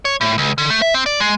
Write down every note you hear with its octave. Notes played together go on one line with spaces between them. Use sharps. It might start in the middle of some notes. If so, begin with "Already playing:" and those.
C#5
A2
C#2
D3
A3
E5
C4
D5
G#3